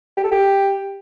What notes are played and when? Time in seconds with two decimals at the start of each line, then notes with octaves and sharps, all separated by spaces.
0.17 G4
0.24 A4
0.31 G4